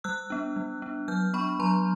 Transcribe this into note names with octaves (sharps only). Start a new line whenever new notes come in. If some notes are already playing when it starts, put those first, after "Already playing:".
G3 E6 F#6
B3 D4
G3
B3 D4
F#3 F6 G6
B3 D4 B5 C#6
F#3 A#5 C6